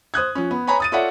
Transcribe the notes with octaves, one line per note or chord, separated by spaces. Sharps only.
C5 D#6 F#6 G#6
F3 C#4
B3
B4 C#5 G#5 A#5 B5
D#6 A6 D#7
F4 A4 C#5 D5 E5 F#5